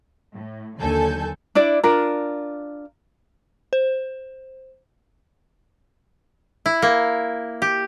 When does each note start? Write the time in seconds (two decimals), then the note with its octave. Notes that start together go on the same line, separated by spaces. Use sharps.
0.34 A2
0.78 D#2 D3 F#3 A4 G#5 G6
1.55 D4 E4 D5
1.84 D4 F4 A#4
3.73 C5
6.66 E4
6.82 A#3
7.62 G4